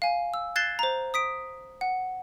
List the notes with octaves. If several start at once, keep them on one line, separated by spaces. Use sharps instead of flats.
F5 G#5
E6
F#6 G#6 A6 C7 E7 G7
C5 A#5
D#6 B6 D7
F#5